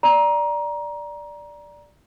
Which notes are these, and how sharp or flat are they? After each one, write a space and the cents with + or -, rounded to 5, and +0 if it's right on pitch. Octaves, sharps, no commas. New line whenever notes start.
D5 +0 A#5 +20